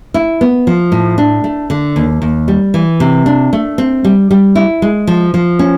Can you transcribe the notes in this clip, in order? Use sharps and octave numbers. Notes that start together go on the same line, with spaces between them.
E4
B3
F3
A2
D4
A3
D3
D#2
D#2
G3
E3
C3
D4
A3
C4
G3
G3
E4
G#3
F3
F3
C#4